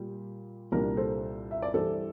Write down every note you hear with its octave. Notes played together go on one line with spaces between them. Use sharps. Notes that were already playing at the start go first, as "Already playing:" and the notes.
Already playing: A#2 G3
C2 A#2 G3 A#3 D4 A#4
A4 C5
E5
D5
G2 E3 G3 A4 C5